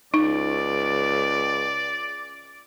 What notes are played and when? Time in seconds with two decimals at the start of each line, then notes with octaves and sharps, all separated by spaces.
0.14 C#2 D#4 D5